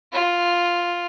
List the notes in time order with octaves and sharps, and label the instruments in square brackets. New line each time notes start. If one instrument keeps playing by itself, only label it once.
[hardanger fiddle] F4